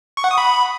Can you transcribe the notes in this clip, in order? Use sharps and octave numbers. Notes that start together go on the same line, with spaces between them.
C#6
F#5
D#6
B5